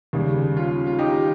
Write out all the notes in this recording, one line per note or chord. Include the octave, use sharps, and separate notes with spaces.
D#2 C#3 G3
C#4 F4
F4
D#4 G4